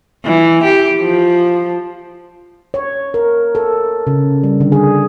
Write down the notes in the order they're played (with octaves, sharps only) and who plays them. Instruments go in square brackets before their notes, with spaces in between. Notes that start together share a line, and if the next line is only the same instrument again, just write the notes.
[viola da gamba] E3
G4
F3
[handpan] C#5
A#4
A4
C#3
G3
D3
G#4